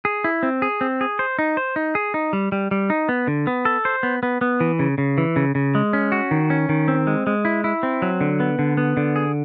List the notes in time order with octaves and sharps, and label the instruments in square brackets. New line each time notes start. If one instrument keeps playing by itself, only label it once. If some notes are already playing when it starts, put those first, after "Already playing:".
[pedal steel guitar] G#4
E4
C4
G#4
C4
G#4
C5
D#4
C5
D#4
G#4
D#4
G3
G3
G3
D#4
B3
D3
B3
A4
C5
B3
B3
B3
E3
C#3
C#3
E3
C#3
C#3
G#3
C#4
F#4
D#3
C#4
D#3
C4
G#3
G#3
E4
E4
C4
F#3
D3
B3
D3
B3
D3
G#4